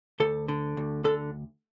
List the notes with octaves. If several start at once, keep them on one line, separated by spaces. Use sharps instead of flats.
D2 A4
D3
D2
D3 A4